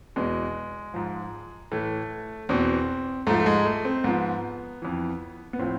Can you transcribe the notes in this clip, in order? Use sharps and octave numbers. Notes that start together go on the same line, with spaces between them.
E2 B2 G#3
G#2 F3
A2 E3 A3
E2 B2 C4
G#2 F3 A3
A3
G#3
A3
C4
G#2 F3 B3
F2 E3
B3
A2 F3 C4